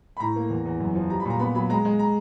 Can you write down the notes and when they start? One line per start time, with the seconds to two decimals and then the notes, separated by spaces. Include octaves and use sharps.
0.17 B5
0.20 A2 A#5
0.36 A#3
0.50 E2
0.66 E2
0.80 F#2
0.95 F3
1.10 G3 A#5
1.20 B5
1.26 A#2 A#5
1.39 B3 B5
1.55 F#3 B5
1.70 G#3 A#5
1.85 G#3
1.99 A#5